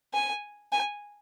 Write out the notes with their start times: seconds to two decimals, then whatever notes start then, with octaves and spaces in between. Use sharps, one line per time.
0.13 G#5
0.72 G#5